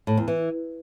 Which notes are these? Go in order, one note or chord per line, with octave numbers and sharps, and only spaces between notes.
A2
E2
E3